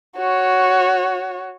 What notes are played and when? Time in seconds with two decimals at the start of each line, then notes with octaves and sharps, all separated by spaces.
0.16 F#4 C#5